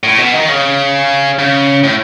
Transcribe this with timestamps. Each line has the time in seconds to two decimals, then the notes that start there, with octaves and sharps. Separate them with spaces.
0.03 A2
0.18 B2
0.34 D#3
0.48 C#3
1.39 C#3
1.84 A2